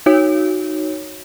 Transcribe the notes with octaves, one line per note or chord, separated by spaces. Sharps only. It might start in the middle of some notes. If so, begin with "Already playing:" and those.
D#4 F#4 C#5